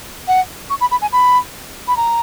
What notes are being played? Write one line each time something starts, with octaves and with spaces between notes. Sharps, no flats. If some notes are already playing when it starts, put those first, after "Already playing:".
F#5
C#6
B5
B5
G#5
B5
B5
A#5